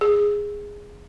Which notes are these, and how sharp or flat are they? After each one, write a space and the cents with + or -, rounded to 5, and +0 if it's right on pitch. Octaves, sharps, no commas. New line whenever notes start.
G#4 -10